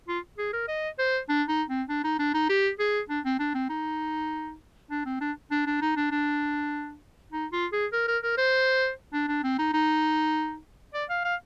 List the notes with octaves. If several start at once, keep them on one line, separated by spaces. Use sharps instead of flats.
F4
G#4
A#4
D#5
C5
D4
D#4
C4
D4
D#4
D4
D#4
G4
G#4
D4
C4
D4
C4
D#4
D4
C4
D4
D4
D4
D#4
D4
D4
D#4
F4
G#4
A#4
A#4
A#4
C5
D4
D4
C4
D#4
D#4
D5
F5
F5